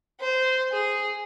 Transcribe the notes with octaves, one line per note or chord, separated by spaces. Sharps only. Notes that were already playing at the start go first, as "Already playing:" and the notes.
C5
G#4